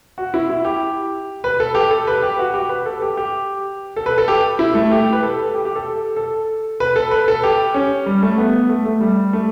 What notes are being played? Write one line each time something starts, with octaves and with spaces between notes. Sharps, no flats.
F#4
E4
E4
G4
B4
A4
G4
A4
B4
G4
F#4
G4
B4
A4
G4
G4
A4
B4
A4
G4
E4
A3
G4
B4
A4
G4
G4
A4
A4
B4
A4
B4
A4
G4
C#4
G3
A3
B3
A3
A3
G3
A3